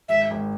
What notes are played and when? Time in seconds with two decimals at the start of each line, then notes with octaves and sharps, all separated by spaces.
0.09 G#1 E5
0.31 G#1